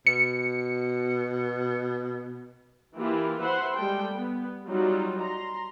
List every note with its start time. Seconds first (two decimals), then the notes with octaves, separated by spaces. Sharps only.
0.07 B2 C#7
2.96 E3 A#3 E4 F4 G4
3.42 B4 C5 E5 F#5 C6
3.75 G3 G#3 A4 G5
4.14 B3
4.68 F#3 G3 D#4 F4
5.22 A#5 C6